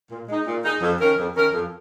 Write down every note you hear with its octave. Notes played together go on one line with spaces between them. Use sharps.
A#2
G#3 D#4
A#2
G#3 D#4
F2
D#3 C#4 A#4
F2
D#3 C#4 A#4
F2